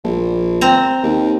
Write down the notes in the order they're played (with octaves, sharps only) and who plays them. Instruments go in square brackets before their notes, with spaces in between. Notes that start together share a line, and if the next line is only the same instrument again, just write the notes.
[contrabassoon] A#1
[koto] C4 A#5
[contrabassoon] D#2